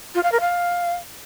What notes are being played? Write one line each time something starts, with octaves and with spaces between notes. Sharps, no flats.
F4
F5
A#4
F5